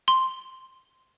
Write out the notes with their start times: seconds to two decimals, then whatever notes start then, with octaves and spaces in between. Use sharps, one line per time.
0.08 C6